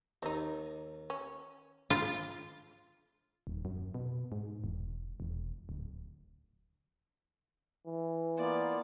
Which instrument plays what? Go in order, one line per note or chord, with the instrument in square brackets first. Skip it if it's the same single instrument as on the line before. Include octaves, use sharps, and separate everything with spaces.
[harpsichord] D#2 [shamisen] C4 D#4
[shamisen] C#4
[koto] F4
[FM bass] D#1
F#2
B2
G#2
E1
E1
D1
[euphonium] E3
[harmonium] A#3 B3 F4 [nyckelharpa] D5